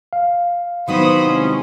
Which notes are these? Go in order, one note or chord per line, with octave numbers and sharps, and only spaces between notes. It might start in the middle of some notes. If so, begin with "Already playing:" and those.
F5
D#3 F#3 B3 D#4 E4 C5 B5 D#6
C3 G#3 C#4